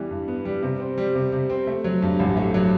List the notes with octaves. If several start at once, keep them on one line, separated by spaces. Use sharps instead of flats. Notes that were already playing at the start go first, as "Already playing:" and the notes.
Already playing: E3 G3 B3
G2
B3
G3
C3
C4
G3
C3
C3
C4
A3
F#3
G2
A1
A3
F#3